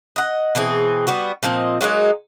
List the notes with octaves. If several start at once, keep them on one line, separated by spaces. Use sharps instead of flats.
D#5 F#5
B2 E3 C4 G#4
G3 B3 F#4
A#2 F3 C4 D#5
F#3 G#3 A#3 D#4